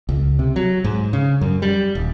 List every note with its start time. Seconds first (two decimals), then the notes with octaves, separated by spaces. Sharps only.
0.09 C#2
0.39 C3
0.56 F#3
0.84 G#2
1.13 C#3
1.41 F#2
1.62 G3
1.95 D#1